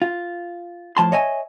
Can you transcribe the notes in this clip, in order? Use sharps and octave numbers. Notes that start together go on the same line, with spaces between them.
F4
A2 F3 A5 C6
C#5 D#5 E5 G#5